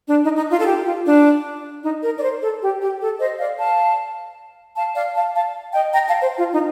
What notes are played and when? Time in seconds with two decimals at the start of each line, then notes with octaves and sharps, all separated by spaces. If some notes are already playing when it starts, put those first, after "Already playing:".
0.07 D4
0.23 D#4
0.36 D#4
0.51 F4
0.59 A4
0.66 G4
0.85 F4
1.04 D4
1.83 D#4
2.03 A#4
2.16 D5
2.22 C5
2.42 A4
2.62 G4
2.80 G4
3.01 A4
3.19 C5 D#5
3.39 D5 F5
3.58 F5 A5
4.76 F5 A5
4.95 D5 F5
5.15 F5 A5
5.34 F5 A5
5.73 D#5 G5
5.93 G5 A#5
6.07 F5 A5
6.22 C5
6.37 F4
6.52 D#4